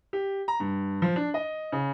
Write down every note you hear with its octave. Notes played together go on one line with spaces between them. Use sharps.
G4
A#5
G2
F3
D4
D#5
C#3